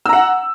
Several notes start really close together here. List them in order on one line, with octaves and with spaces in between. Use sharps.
E6 A#5 F#5